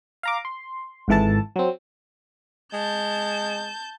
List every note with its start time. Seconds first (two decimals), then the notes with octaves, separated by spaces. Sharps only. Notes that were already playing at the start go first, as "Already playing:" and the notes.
0.23 F5 A#5 D6
0.45 C6
1.08 G#1 G#2 E3 A4 A5
1.56 F#3 C4
2.73 G#3 A5 G6